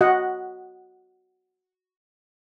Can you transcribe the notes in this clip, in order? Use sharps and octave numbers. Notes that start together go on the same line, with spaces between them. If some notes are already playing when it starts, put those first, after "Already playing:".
F#4 D#5 F#5